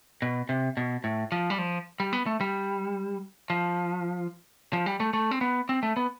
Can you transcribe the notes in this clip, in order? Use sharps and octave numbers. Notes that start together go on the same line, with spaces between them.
B2
C3
B2
A2
F3
G3
F3
G3
B3
A3
G3
F3
F3
G3
A3
A3
C4
B3
C4
A3
B3